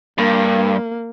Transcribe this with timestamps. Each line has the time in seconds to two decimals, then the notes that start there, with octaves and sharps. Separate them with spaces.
0.18 G2 A#3